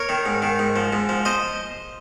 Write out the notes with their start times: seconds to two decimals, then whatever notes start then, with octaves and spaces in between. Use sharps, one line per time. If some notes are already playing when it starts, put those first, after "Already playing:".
Already playing: A#4 C#5
0.09 D#3
0.26 G#2
0.42 D#3
0.59 G#2
0.76 F3
0.93 G#2
1.09 F3
1.25 C5 D#5